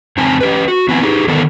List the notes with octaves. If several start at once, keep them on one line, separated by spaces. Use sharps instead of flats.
F2 C#3 C4 G#5 A5
C#4 G4 B4
F#4
E3 B3 C4 E4 G#5
D#4 G4 G#4
D3 D#3 B3 D4 A4 A#4